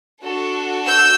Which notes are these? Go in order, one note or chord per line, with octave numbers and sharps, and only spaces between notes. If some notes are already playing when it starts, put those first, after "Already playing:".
D4 F#4 A4
E6 G6